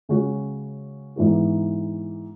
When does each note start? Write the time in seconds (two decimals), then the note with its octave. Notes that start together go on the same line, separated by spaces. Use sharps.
0.09 C#3 G#3 C#4 F#4
1.16 G#2 E3 B3 D#4 F#4